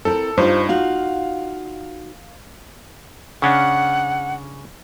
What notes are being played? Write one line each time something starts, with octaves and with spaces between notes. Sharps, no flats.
C4 E4 A4 A#4
G2 D#4 F4 A4 C5
D#4 F4 F#4 F5
C#3 C#4 D4 F#5